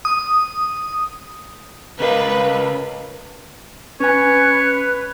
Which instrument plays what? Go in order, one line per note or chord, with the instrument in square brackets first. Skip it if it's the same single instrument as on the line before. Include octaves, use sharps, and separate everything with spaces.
[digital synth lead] D#6
[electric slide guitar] C#3 D#5 F5 [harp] A#4 A#5 [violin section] B4
[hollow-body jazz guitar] C#4 G#5 [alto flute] B4 [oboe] C#5